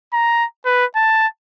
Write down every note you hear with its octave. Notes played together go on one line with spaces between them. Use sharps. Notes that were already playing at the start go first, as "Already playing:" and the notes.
A#5
B4
A5